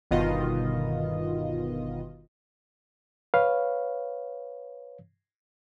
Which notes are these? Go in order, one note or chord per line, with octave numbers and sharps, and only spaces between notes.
G1 B2 D#3 B3 F4 D#5
B4 C#5 F5